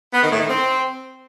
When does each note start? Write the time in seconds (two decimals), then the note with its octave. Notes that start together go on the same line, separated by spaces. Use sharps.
0.13 B3
0.22 D#3
0.31 A2
0.40 D#3
0.49 C4